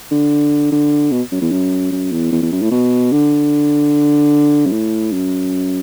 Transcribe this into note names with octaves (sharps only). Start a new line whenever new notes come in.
D3
D3
B2
F#2
E2
F#2
F#2
E2
E2
E2
F#2
A2
B2
D3
F#2
A2
F#2